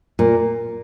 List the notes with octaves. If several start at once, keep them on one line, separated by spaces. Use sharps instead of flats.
A#2